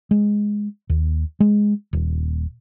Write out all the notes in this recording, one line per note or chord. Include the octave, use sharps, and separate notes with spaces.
G#3
D#2
G#3
D#1